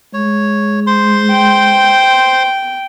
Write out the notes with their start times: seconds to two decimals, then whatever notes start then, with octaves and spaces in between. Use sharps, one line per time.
0.14 G#3 C#5
0.87 C5 C6
1.31 G5